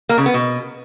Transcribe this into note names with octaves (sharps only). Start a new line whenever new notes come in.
A#3
C#3
B3
B2